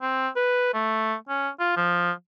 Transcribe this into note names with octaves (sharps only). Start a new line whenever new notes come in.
C4
B4
A3
C#4
F4
F3